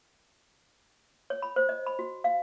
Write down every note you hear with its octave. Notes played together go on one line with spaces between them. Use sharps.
C#5
B5
C5
D#5
B5
F#4
F5